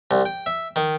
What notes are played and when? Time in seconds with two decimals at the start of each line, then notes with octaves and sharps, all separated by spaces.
0.11 C2
0.25 G5
0.46 E5
0.76 D#3